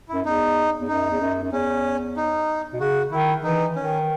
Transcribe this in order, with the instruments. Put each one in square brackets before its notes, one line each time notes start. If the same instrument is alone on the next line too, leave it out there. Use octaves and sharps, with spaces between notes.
[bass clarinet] F#2 [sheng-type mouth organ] E4
[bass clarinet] E2 [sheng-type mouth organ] D#4
[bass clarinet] E2
[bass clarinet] F#2 [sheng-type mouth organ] D#4
[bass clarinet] E2
F#2
F#2
[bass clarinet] E2 [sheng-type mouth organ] C#4
[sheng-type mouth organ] D#4
[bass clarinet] B2
[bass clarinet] C#3 [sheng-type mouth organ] F#4
[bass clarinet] D#3 [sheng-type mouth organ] E4
[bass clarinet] E3 [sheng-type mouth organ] D#4
[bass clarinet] D#3 [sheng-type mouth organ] C#4